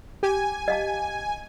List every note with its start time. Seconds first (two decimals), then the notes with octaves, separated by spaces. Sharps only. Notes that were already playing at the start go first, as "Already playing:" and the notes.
0.23 G4 G#5
0.68 D#5 F5 A5